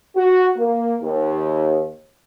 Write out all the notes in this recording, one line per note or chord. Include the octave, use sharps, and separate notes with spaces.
F#4
A#3
D#2